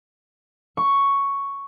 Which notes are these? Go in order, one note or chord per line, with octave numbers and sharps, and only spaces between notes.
C#6